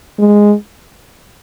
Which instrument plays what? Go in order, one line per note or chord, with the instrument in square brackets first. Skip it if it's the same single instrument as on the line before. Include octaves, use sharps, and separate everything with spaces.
[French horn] G#3